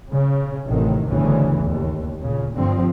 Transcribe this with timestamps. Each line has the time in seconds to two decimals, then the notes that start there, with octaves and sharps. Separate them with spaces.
0.10 C#3
0.67 A1 A2 C3 D#3
1.07 G1 D2 C#3 E3
1.66 D#2
2.17 A#2 C#3
2.54 G2 D3 F3 C4